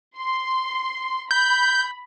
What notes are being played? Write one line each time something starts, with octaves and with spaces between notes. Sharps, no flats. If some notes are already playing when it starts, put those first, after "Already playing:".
C6
B5 G6